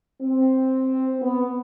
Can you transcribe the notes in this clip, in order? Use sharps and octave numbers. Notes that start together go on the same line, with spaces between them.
C4
B3